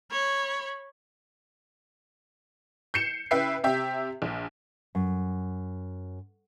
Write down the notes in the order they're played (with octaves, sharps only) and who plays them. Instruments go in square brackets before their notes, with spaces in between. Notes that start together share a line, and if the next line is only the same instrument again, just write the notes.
[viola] C#5 B5
[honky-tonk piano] G6 C7 C#7 E7
C#3 E4 B4 E5 G5 C7
C3 G4 E5
A#1
[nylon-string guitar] F#2